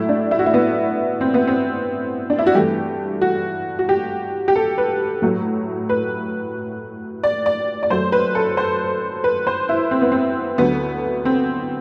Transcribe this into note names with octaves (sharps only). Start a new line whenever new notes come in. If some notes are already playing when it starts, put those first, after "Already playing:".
Already playing: A2 F#3 A3 E4
D4
E4
F#4
E4
B3
C4
B3
C4
D4
E4
F#4
G2 E3 A3 G4
F#4
F#4
G4
G4
A4
B4
A2 F#3 A3
B4
D5
D5
D5
F#2 F#3 A3 C5
B4
A4
C5
B4
C5
E4
C4
B3
C4
D2 D3 F#3 A3 B3
C4